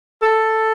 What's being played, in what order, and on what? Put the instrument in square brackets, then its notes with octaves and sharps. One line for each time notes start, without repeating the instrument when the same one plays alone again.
[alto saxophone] A4